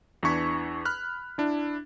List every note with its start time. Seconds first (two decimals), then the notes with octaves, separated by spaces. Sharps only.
0.23 E2 E3 D4 C#6 G#6 B6
0.85 B5 F6 F#6
1.38 D4 E4